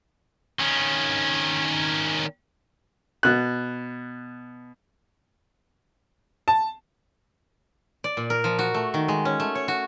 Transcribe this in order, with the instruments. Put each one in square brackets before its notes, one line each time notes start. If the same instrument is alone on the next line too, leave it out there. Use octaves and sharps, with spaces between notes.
[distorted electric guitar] D#3 C#4
[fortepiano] B2 F#6
[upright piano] A5
[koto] D5
A#2
A#4
F3
F#4
A3
D#3
G#3
C#4
A3
C#5
F#4